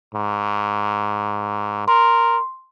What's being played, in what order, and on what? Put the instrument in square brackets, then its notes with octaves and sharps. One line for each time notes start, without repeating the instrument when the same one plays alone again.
[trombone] G#2
[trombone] A#4 [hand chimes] C6